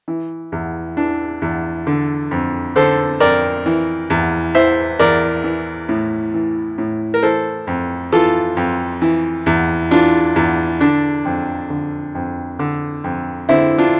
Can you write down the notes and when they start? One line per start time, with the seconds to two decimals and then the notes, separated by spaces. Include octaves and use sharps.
0.08 E3
0.52 E2
0.97 E3 D4
1.42 E2
1.87 D3
2.31 F2
2.76 D3 A4 C5
3.20 F2 A#4 D5
3.66 E3
4.10 E2
4.55 E3 C5 E5
4.99 E2 A#4 D5
5.44 E3
5.89 A2
6.34 E3
6.78 A2
7.14 A#4
7.23 E3 A4 C5
7.67 F2
8.12 E3 F4 A4
8.57 F2
9.02 E3
9.46 E2
9.91 E3 D4 F4
10.36 E2
10.81 D3 D4
11.25 F2
11.70 D3
12.15 F2
12.59 D3
13.04 F2
13.49 D3 C4 E4
13.78 D4 F4